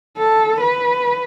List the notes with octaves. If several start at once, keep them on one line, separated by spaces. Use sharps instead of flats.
A4
B4